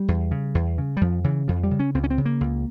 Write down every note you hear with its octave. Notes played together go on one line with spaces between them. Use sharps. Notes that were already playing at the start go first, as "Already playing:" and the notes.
Already playing: G3
E2
C#3
E2
C#3
G3
F2 F3
C#3 E3
F2 F3
G3
C#3
C#4
C#2 C4
C#4
C4
C#3
A#3
C#2